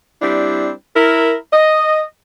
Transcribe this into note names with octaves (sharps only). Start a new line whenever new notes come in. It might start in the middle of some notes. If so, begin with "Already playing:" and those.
G3 C4 D4 E4
E4 A#4
D#5